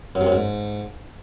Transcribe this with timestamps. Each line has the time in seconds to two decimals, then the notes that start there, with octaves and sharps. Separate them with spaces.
0.15 F#2
0.21 C3
0.26 F#2
0.32 G#2